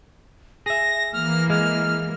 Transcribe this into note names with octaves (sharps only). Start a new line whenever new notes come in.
G#4 E5 A#6
E3 A#3 F6
G#3 F6